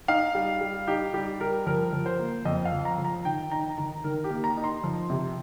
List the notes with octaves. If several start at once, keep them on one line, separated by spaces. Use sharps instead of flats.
D#4 F5
G3
G3
D#4 G4
G3 G4
G3 A#4
F3 A#4
F3
C5
A#3
F2 D#5
F5
F3
A#5
F3
A#5
D#3 G5
D#4 A#5
D#3 A#5
D#3 A#4
G4
A#3
A#5
D#4
C6
F3
C3